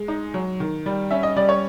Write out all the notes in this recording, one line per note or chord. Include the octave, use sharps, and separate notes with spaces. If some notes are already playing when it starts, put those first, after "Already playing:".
Already playing: G#3
D#4
F#3
D#3
G3
C#4 E5
D#5
G3 D5
C#5